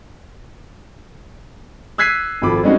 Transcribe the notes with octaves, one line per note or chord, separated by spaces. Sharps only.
E6 F#6 G#6 B6 C7 D#7
G#1 F3 A4 B5 D6
G3 G#3 C4 C#4 D#4 F#4